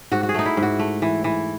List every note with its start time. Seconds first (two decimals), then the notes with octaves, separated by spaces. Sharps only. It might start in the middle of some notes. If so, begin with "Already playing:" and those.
0.12 G#2 F#4
0.23 F#4
0.29 G#4
0.34 A3 D#4
0.46 E4
0.57 G#2
0.63 F#4
0.79 A3
1.02 E3
1.24 E3